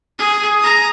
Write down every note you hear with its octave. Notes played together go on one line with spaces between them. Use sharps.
G#4
A#5 D#6